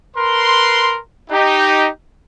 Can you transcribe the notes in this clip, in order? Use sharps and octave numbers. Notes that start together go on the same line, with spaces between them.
A#4 B4 C6
D#4 G4